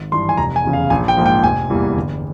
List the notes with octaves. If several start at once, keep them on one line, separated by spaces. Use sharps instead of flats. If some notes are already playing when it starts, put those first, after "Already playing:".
Already playing: G#1
G2 E3 C6
G#5
F1 A#5
G#5
E2 C#3
F5
A#1 G#5
G5
G#2 F3 A#3
G5
F1 G#5
E2 E3 G3 A#3
G1